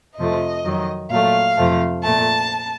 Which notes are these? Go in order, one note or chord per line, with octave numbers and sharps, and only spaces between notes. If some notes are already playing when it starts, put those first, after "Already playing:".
F2 C3 F3 A3 D#5
F2 D#3 F#3
A#2 F#3 A3 F5
F2 C3 F3 A3
A#2 A3 A5